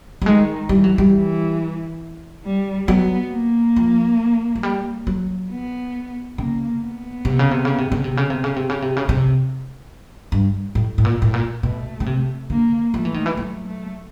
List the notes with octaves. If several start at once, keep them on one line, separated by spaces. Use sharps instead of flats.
G3
D#3 G#3
E3 G3
F#3
G3
E3
G3
F#3 B3
A#3
F3
F#3
G3
F#3
B3
C#3 A#3
B3
C3
C#3
C3
C#3
C3
C#3
C3
C#3
C3
C#3
C3
C#3
C3
C#3
C3
G2
A2
A2
A#2
A2
A#2
B2 A3
C#3
C3
D3 A#3
F3 A3
E3
D#3
E3
F#3 A3
A3